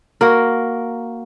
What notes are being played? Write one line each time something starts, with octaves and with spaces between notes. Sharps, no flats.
A#3 F#4 A#4